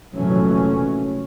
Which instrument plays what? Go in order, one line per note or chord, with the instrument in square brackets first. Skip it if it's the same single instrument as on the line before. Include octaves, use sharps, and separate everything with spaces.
[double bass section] F1 A#2 E3 F#3 A3 C#4